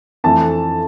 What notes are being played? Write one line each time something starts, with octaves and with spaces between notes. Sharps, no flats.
F2 E3 A3 A5